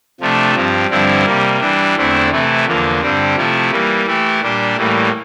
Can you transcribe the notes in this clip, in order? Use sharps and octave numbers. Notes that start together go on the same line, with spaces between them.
C3 F3 A3 D4
G2 F3 C4
G2 D3 F3 C4 E4
C3 G3 A#3
E3 G3 D4
E2 D3 A3 C4 E4
C3 E3 A3 E4
E2 D3 F3 A#3
G2 D3 G3 C4
C3 F3 A3 E4
E3 G3 A#3
E3 A3 E4 G4
A#2 G3 D4 G4
A2 E3 G3 A#3